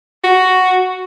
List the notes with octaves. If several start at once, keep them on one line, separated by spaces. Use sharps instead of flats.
F#4